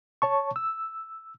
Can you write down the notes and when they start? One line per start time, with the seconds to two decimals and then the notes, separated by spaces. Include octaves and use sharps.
0.22 C#5 A5 C#6
0.56 E6